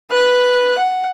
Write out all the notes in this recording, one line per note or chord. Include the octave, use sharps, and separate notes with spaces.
B4 F#6
F#5